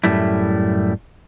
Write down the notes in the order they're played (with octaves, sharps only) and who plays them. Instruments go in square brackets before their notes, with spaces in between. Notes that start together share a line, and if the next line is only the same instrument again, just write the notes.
[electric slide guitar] F#2 A2 G3 A3 E4